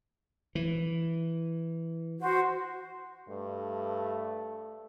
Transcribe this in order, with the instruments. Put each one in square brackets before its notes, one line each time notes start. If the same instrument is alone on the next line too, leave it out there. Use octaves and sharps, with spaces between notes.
[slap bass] E3
[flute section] F#4 C5
[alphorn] G2 [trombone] A3